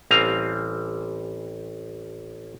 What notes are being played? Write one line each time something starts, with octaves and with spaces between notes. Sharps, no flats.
A1 G3 C4 F5 G#5 A#5